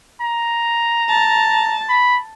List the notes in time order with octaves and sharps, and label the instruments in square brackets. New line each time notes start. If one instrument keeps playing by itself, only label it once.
[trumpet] A#5
[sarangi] A5
[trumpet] B5